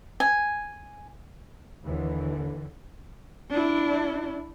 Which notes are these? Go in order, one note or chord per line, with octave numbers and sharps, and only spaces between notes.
G#5
D#2 D3 E3
D4 E4